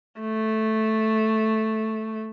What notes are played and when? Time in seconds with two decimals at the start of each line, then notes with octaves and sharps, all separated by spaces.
0.21 A3